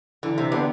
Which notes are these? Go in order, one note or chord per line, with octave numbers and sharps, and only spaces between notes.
D3 E3
C3
D3 B3 D4 G4